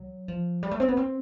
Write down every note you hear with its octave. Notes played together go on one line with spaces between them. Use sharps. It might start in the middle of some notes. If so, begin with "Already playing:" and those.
Already playing: F#3
F3
G3
A3
C4
B3
C4